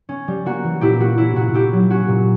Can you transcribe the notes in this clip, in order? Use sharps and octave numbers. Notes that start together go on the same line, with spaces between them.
C#4
G3
A#3 F#4
E3
A#2 E4 G4
A#3 F#4
C#4 E4
A#2 F#4
A#2 E4 G4
F#3
C#4 F#4
A#2